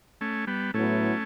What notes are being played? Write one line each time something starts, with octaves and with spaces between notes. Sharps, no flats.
A3 C#4
G3 B3
A2 F#3 A3 B3 C#4 E4